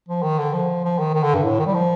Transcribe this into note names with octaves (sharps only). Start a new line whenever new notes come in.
F3
D#3
D3
F3
F3
D#3
D#3
D3
G2
A2
D#3
G3
F3